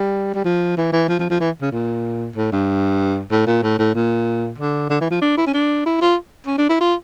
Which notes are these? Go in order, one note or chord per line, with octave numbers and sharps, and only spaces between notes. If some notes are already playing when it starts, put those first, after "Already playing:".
Already playing: G3
G3
F3
E3
E3
F3
F3
F3
E3
C#3
A#2
A2
G2
A2
A#2
A2
A2
A#2
D3
D3
E3
F3
D4
E4
C#4
D4
E4
F4
C#4
D4
E4
F4